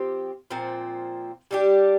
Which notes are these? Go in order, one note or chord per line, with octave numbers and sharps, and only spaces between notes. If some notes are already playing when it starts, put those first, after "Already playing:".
Already playing: F3 C4 G4
A#2 F3 C4
G3 D4 G4